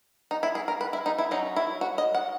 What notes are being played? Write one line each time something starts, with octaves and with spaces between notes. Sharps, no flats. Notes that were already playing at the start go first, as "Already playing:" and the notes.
D#4
E4
G#4
A#4
B4
E4
D#4
E4
F#3 C#4 D#4
E4
F#4
D#5
F#5